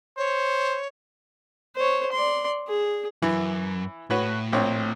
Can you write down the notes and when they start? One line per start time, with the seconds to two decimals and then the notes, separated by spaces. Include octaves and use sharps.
0.17 C5 C#5
1.76 C5 C#5
2.12 D5 C6
2.68 G#4
3.22 F#2 E3
4.10 A2 F#4 B4 C#5
4.52 A#1 C4 C#5